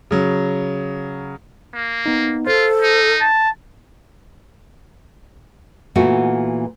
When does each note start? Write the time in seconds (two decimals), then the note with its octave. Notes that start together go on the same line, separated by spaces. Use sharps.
0.11 C#3 F#3
1.74 A#3
2.06 B3 D#4
2.47 F4 A4 C5
2.82 D#4
3.21 A5 A6
5.96 A#2 E3 A3 B3 F#4